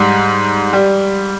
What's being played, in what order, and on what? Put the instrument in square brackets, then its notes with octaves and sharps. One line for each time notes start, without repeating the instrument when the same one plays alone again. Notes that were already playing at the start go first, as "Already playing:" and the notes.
Already playing: [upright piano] G#2 G3
G3